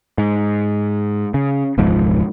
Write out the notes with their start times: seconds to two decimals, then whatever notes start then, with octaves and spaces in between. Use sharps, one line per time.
0.18 G#2
1.34 C#3
1.78 E1 C#2 G#2 F3